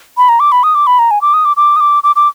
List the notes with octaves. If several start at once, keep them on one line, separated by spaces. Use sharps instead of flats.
B5
A#5
D6
B5
D#6
D6
B5
A#5
G#5
D6
D#6
D6
D6
D#6
D6
D6
D6